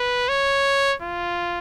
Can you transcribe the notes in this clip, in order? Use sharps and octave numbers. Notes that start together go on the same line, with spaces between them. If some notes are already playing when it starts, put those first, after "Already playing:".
Already playing: B4
C#5
F4